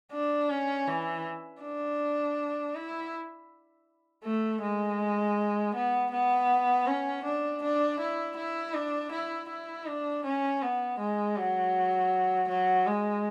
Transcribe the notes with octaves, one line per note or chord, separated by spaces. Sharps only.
D4
C#4
E3
D4
E4
A3
G#3
B3
B3
C#4
D4
D4
E4
E4
D4
E4
E4
D4
C#4
B3
G#3
F#3
F#3
G#3